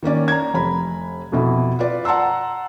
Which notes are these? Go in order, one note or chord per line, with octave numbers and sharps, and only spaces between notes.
D#3 A#3 C#4 D5
A#5 G#6
F1 A#5 B5
F2 B2 E4
F4 B4 D5
F#5 A5 A#5 C6 E6